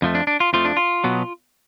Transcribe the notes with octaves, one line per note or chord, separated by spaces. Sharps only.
F2 F3 A3
D4
D4
F4
F2 F3 A3 F4
D4
F4
B2 F#3 B3